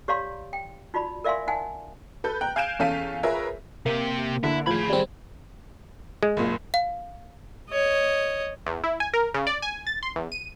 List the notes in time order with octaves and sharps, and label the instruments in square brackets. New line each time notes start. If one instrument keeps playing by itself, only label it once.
[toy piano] G4 C#5 D5 F5 A#5 C6
G5
D#4 F4 F#4 D5 B5
A#4 D5 E5 F5 G#5 C6
D#4 F#5 G#5
[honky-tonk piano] A4 B4 G6
G5 A#5 F#6
F5 G#5 G6 D7 E7
E2 C#4 A4 F5 B6 D#7
F4 G#4 A#4 B4 C#5 E5
[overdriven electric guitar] C3 G4 [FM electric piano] A#3
[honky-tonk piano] D3 [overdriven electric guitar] E4
[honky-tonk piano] A2 F3 G#6 [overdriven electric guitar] G#4 B5
[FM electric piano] G3 C4
[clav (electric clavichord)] G#3
[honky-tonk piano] F#1 A#2
[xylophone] F5
[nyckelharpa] C#5 D#5
[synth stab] E2
E4
G#5
A#4
C#3
D5
G#5
A6
C6
E2
D#7